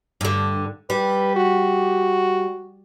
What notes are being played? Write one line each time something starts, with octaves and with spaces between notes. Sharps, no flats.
G2 D3
G3 B4
F#4